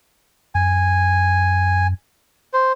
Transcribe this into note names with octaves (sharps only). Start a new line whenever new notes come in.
F#2 G#5
C5